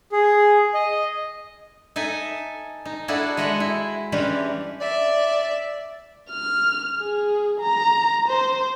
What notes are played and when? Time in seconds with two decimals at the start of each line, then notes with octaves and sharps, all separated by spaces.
0.12 G#4
0.74 D#5
1.96 D#4 A4 E5 G#5
2.85 D#4
3.08 D4 E4 F#4 G#4 A4
3.37 G#3 F#4 G#4 D#5 E5 F#5
3.60 E4
4.12 E3 G3 G#3 C#4 D4 G4
4.80 D5 E5
6.31 F6
6.99 G#4
7.60 A#5
8.28 C5